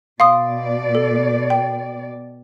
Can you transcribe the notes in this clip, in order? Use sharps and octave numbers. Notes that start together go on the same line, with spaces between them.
B2 D5 F5 C6 D#6
A4
G5